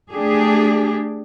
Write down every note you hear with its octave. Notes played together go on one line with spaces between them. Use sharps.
A3 D4 G4 G#4